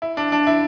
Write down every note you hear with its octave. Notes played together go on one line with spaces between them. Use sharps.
E4
D4
D4
E4